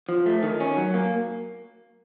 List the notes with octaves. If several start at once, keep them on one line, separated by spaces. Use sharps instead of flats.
F3
A3
D#3
C#4
F#3
A#3